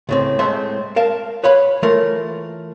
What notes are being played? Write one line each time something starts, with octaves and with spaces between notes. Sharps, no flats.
C#2 A2 C4
A2 G#3 C4 C5 E5 A5
A#4 F5 A5
B4 C#5 F5 B5
E3 A3 F4 A#4